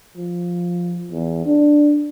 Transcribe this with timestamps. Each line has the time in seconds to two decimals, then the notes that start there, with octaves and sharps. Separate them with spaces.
0.16 F3
1.11 E2
1.46 D4